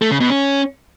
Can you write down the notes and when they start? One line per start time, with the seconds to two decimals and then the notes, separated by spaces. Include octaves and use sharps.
0.02 A3
0.11 C#3
0.20 B2
0.30 C#4